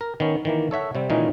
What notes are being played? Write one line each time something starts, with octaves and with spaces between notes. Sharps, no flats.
A#4
D#3 B3 C#4
D#3 E3 A#3
A4 C#5 E5 F#5
C3 G3 C4
A#2 D#3 E3 G#3 C#4 D#4